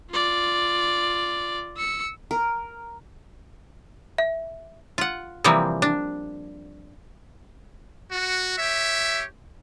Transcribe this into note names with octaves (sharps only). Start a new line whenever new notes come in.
F4 D5
E6 C#7
A#4
E5
F4 F#5
C3 E3 F3 G3 A#3 C4
D4
F#4
G4 C#5 E5